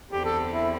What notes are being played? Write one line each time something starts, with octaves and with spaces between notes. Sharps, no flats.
E2 D3 G3 C4 G4
A4
E4